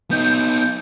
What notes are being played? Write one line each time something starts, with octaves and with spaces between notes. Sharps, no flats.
B3 D#4 G6